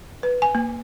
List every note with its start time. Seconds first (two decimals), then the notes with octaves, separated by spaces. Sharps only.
0.23 B4
0.42 G#5
0.55 A#3